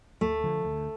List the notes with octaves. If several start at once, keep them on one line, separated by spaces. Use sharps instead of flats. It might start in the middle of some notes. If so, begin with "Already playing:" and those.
D2 A3
D3 F3
D2